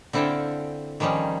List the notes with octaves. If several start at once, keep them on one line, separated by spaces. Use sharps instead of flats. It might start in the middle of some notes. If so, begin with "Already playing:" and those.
D3 C4 E4 F4 A4 G5
D#3 F3 G3 C#4 D#4